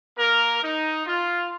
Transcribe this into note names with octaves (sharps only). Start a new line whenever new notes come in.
A#3 A#4
D#4
F4